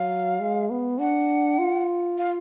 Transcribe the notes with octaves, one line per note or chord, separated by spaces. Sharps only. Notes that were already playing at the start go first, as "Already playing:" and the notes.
Already playing: F#3 F5
G#3
B3
D4 F#5
F4
F5